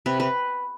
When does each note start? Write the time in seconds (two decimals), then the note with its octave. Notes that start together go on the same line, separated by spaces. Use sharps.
0.06 C3 B4
0.20 B4